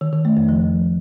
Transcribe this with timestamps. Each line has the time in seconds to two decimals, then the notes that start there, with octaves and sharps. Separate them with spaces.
0.01 D#3
0.13 D#3
0.25 A3
0.37 F2
0.49 F3